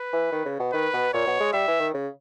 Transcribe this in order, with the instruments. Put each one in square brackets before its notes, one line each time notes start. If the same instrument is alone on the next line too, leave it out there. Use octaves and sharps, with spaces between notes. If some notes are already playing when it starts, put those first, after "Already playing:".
Already playing: [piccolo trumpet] B4
[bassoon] E3
D#3
C#3
B2
[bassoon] D#3 [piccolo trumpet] B4
[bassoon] B2
[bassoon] A#2 [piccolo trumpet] C#5
[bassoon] B2
G#3
[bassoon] G3 [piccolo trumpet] E5
[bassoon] E3
D#3
C#3